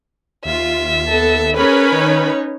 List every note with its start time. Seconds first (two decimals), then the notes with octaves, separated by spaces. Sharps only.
0.45 D#2 F4 E5
1.08 B3 A4 A5
1.56 C#4 G#4 A#4 B4 C#5 B5
1.92 D#3 D#4